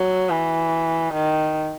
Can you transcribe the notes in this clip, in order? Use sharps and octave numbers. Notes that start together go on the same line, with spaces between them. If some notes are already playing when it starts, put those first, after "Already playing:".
Already playing: F#3
E3
D#3